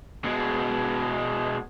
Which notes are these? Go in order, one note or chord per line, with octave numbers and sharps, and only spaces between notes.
B2 G#3